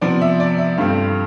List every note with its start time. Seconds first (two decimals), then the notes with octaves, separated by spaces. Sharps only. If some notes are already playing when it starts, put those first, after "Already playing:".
0.01 C3 F3 B3 D5
0.22 E5
0.40 D5
0.58 E5
0.78 G2 F3 A3 C4 F5